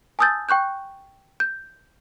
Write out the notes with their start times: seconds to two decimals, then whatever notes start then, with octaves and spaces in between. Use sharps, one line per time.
0.19 G#5 A5 D#6 E6 G6 A6
0.49 G5 C#6 F#6 G6
1.40 G6